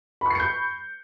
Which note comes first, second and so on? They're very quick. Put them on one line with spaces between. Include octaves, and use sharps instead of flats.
B5 C#6 C7 C#7 G6